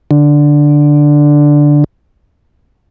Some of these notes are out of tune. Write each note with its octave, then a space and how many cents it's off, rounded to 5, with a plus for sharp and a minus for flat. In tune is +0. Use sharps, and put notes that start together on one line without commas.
D3 +0